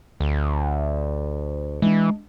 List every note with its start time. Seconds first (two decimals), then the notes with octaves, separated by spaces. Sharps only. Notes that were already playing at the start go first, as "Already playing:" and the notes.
0.20 D2
1.82 E3 G#3 D4